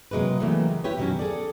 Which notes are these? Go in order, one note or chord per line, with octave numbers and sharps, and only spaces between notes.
C3 F#3 G#3 A#3 B4
C#3 E3 F#3 G3 A3 A#3
G#3
E4 G4 B4 C#5
F#2 B2 D#3 E3 F#3 C#4
G#4 A4 D5